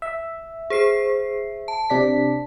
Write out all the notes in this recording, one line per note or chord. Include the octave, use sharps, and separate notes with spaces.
E5
G#4 C5 C7
A5
C3 D4 B6